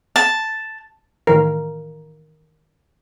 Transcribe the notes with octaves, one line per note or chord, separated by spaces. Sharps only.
A5
A2 D#3 E3 A#4